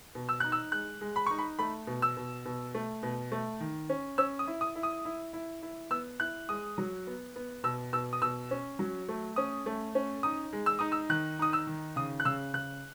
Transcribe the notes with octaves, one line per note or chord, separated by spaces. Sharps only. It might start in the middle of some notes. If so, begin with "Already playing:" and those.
B2
E6
D#4 F#6
E6
G#3 F#6
G#3
B5
D#4 C#6
B5
A3 B5
B2
E6
B2
B2
A3
B2
A3
D#3
C#4
C#4 E6
D#6
E4
D#6
E4
D#6
E4
E4
E4
B3 E6
E4 F#6
G#3 D#6
F#3
B3
B3
B2 E6
B2 E6
D#6
B2 E6
C#4
F#3
A3
C#4 D#6
A3
C#4
D#4 D#6
G#3
E6
D#4 D#6
E6
D#3 F#6
D#4 D#6
E6
D#3
C#3 D#6
F#6
C#3 E6
C#3 F#6